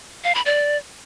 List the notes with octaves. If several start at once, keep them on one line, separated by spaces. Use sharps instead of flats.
F5
B5
D5